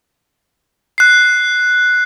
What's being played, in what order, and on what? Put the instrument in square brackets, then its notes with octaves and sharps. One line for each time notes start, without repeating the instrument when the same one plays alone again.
[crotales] F#6 C7